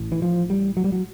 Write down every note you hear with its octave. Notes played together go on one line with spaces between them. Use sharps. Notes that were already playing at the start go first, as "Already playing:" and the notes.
Already playing: A1 A2
E3
F3
G3
F#3
G3
F#3